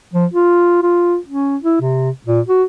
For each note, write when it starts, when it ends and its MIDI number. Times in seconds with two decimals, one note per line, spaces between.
0.13 0.26 53
0.34 0.78 65
0.82 1.17 65
1.28 1.57 61
1.62 1.78 64
1.81 2.10 48
2.26 2.41 46
2.48 2.64 66